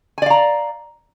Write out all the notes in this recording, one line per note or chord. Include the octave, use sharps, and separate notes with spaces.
D5 F5 G#5 A#5